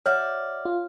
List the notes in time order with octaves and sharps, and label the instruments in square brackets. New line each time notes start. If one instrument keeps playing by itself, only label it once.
[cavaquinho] F#4 D5 E5 [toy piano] C#5 [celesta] F6
[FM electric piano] F4